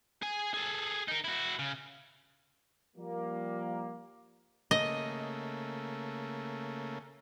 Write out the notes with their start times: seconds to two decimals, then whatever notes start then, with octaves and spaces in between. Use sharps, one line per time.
0.22 G#4 G#5
0.54 G#4 A4
1.08 D#4 A#4
1.24 E4 F#4
1.59 C#3
2.96 F3 G3 A#3
4.71 C#3 A3 A#3 D#5